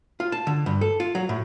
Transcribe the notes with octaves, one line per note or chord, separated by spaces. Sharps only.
F4
A5
D3
G2
A4
F4
F#3
A2